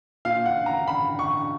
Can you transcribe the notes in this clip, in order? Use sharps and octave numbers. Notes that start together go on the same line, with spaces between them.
A#2 F5
F#5
A#5
B5
C#6